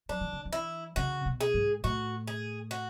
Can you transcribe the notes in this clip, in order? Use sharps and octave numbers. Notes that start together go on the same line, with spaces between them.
F#3 D4
E3
D3
E3
E4
C#3 F#4
B2
G#4
G#2
A2 F#4
G#4
F#4